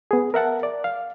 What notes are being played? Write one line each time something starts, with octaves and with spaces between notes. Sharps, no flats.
B3 G#4
A#4 E5 F#5 A5
D5
F5